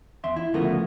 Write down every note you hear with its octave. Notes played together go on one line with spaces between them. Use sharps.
E2 E5 C6
E4
D2 C#3 F3 A3 B3 A#4